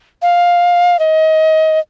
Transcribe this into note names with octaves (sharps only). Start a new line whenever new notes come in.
F5
D#5